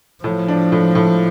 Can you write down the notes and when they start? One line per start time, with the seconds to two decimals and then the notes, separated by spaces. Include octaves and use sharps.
0.24 A2 F3
0.48 D4
0.72 A2
0.95 A2